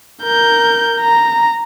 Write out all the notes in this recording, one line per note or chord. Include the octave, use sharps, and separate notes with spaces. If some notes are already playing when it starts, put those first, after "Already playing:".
A#4 G6
A#5